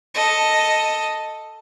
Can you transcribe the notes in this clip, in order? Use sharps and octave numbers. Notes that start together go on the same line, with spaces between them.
A4 D#5